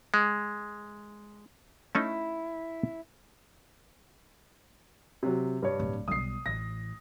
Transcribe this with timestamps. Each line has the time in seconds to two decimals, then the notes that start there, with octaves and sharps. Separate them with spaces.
0.14 G#3
1.95 A3 C#4 D#4 E4
5.23 C3 F#3
5.62 G2 C#5
5.80 D1
6.08 B1 G3 D#6 C7
6.46 A1 A#6